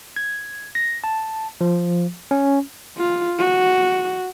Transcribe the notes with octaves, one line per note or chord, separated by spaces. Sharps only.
G#6
A#6
A5
F3
C#4
F4
F#4